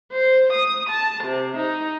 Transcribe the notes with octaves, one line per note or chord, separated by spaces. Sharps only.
C5
D#6
A5
C3
D#4